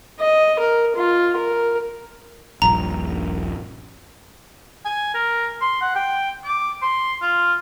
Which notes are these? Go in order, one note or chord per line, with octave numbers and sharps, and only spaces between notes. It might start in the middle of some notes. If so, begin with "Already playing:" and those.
D#5
A#4
F4
A#4
D#1 A#1 G2 A#5
G#5
A#4
C6
F#5
G5
D6
C6
F4